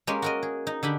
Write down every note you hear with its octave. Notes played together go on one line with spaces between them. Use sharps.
G#3 A#3 C#4 G4
F#4 A#4 D#5
G#4
D#4
D3 D4 G4 B5